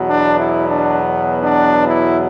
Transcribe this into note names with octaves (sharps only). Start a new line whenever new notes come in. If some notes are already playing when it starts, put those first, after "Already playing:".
Already playing: E2 B2 F#3 B3
D4
E4
D4
D4
E4